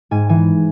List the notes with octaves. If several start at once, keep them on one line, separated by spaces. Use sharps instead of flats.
G#2 G#5
E3 G#5